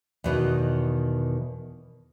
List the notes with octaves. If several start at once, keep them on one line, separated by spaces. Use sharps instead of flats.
E2 B2 D#3